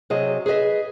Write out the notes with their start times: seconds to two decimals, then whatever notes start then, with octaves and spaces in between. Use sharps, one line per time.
0.10 C3 F#3 G#4 D#5
0.46 G#4 B4 C5 D#5 E5